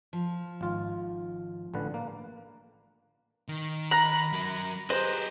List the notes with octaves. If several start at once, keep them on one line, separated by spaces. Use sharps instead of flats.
F3
G#1 F4
A1 D3 B4
A#3
D#3
A#5 B5 F#6
F#3 A#4
G4 G#4 B4 C5 D#5